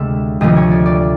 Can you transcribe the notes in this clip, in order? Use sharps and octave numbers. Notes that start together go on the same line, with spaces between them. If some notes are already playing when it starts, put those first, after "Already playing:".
Already playing: D2 C3 G#3 E5
D2 C3 F3 A3 D#5
C#5
D5
D5